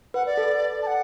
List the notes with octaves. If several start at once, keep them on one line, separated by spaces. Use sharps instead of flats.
B4 F#5
D5
A4
A5
F#5